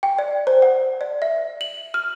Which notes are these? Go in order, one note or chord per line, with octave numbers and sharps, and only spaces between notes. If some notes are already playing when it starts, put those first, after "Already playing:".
G5
D5
C5
F#5
D5
E5
F#7
F6